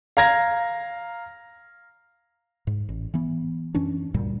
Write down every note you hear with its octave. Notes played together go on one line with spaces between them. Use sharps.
F5 A#5 G#6 A#6
G#2
A1
E3 B3
F#2 E3 C#4 D4
D2 G2 A#2 G3